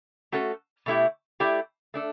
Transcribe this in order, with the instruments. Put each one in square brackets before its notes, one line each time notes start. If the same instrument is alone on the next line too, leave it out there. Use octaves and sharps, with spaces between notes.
[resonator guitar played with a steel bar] A3 C#4 F#4 A4
B2 A3 E4 G4
A3 E4 G4 D5
A3 D4 A4